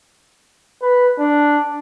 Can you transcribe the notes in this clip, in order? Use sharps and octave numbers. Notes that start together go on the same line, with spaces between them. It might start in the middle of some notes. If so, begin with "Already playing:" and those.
B4
D4